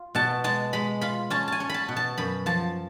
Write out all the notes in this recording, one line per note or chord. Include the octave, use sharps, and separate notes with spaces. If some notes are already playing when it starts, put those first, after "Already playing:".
Already playing: F4
B2 A5
G#3 A5
G#3 B5
F4 B5
C#4 A5
G#5 A5
C#4
A5 B5
B2
A5
F#2 B5
F3 A5